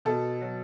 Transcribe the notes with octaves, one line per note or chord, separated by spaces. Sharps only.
B2 A4
F#3